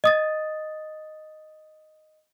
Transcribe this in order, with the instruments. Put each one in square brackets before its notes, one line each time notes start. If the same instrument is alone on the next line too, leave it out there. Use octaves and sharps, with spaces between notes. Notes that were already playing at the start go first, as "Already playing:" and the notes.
[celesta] D#5 D#6 A6